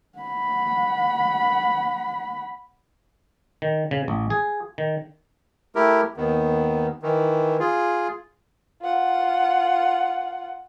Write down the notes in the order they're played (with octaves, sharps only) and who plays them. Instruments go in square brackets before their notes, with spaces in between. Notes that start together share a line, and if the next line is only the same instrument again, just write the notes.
[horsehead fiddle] F#5 B5
[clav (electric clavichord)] D#3
C#3
A1
G#4
D#3
[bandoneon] A3 E4 G4 A#4
D#2 D#3 B3
D#3 E3
F4 G#4
[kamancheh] F4 F#5